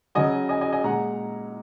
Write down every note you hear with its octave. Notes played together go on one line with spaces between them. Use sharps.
C#3 F#3 D#5 G#5
D#5 G#5
D#5 G#5
D#5 G#5
A#2 G#3 F#5 A#5